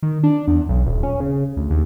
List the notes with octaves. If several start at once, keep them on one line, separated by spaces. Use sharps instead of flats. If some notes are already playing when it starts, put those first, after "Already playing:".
D#3
D4
E2
B1
D#1
C#4
C#3
D2
D#2